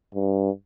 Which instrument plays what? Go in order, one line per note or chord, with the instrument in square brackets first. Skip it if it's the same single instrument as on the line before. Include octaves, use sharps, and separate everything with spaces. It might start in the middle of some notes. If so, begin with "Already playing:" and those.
[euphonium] G2